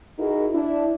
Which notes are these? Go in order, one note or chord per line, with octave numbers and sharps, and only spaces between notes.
D#4 E4 F#4 G#4 A#4
D4 E4